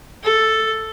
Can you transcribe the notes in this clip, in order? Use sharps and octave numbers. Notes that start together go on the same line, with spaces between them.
A4